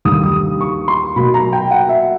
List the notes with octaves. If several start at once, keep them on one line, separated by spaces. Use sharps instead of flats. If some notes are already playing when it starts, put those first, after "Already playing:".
D#2 D3 G3 D#6
D#6
C#6
C6
B2 F#3 A#3 B5
A#5
G5
F#5
E5